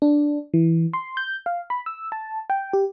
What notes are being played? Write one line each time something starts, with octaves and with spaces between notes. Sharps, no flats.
D4
E3
C6
G6
F5
B5
E6
A5
G5
G4